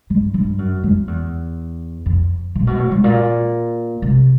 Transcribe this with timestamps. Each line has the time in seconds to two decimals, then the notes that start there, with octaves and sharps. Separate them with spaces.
0.10 G2
0.34 G2
0.59 F#2
0.84 F2
1.07 E2
2.06 F2
2.55 A#2
2.67 B2
2.79 A2
2.92 G#2
3.04 A#2
4.02 C3